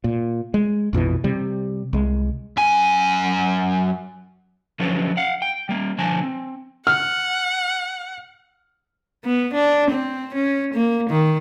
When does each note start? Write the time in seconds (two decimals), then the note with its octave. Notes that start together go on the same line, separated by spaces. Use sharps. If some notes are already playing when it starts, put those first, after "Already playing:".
0.04 A#2
0.54 G#3
0.93 A#1 F2 B2 E3
1.24 C3 G3
1.93 C2 G#3
2.57 F#2 G#5
4.79 D3 F3 F#3 C#4 A4 B4
5.17 F5 F#5
5.42 G5
5.69 G3 A#3
5.98 D3 F3 G#5 A5
6.23 C4
6.87 F#5 F6
9.24 B3
9.54 D4
9.90 C4
10.34 C#4
10.74 A#3
11.10 D#3